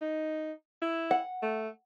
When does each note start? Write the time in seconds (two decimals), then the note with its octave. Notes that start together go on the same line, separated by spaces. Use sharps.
0.01 D#4
0.82 E4
1.11 F#5
1.42 A3